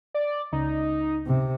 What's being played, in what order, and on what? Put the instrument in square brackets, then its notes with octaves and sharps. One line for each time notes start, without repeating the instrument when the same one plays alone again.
[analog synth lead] D5
[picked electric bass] C#2 [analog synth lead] D#4
[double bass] C3